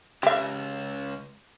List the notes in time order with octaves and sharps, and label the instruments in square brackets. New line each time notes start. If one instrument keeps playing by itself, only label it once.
[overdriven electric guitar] C#2 [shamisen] G4 E5